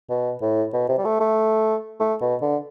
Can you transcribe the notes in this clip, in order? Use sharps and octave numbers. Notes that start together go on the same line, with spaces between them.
B2
A2
B2
C3
G3
A3
A3
A3
B2
D3